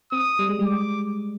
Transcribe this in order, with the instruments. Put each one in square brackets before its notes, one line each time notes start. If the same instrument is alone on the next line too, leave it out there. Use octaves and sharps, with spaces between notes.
[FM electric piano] C4 [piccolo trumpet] D#6
[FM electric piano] G3
G#3
G3
[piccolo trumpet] D6